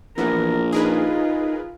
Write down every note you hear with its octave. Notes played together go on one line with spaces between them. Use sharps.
A#1 E3 B3 A#4
D#4 F4 G#4 A#4 B4